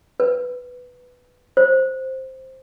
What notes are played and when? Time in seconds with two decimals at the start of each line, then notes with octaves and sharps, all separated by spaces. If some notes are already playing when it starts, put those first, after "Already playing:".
0.20 B4
1.57 C5